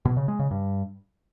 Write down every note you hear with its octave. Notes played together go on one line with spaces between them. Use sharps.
B2
C#3
G#3
C#3
G2